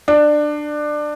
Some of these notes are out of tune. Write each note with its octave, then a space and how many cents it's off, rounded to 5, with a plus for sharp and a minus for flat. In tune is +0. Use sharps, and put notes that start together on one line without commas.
D4 +20